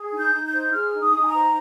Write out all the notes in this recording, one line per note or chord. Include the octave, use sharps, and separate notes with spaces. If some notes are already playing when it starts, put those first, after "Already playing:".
Already playing: G#4
D#4
G6
D#4
G6
C5
G#4 F6
D#4
D#6
D#4
G#5
A#5
C5